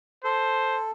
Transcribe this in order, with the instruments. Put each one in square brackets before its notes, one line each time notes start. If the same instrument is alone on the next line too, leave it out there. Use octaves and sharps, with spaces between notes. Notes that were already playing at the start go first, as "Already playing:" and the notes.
[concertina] A4 [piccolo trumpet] C5